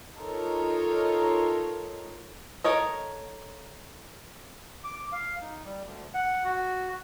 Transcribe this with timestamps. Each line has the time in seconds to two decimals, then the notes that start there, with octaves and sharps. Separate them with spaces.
0.16 D#4 F4 A4 A#4 C#5
2.64 A4 A#4 C#5 D#5
4.84 D6
5.12 F5
5.41 D#4
5.65 G3
5.84 D2
6.14 F#5
6.44 F#4